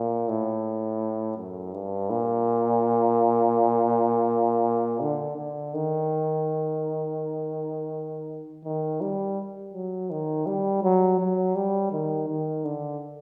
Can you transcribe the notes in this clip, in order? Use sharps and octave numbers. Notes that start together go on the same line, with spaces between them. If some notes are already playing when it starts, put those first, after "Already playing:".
Already playing: A#2
A2
F#2
G2
A#2
D3
D3
D#3
D#3
G3
F#3
D#3
G3
F#3
F#3
G3
D#3
D#3
D3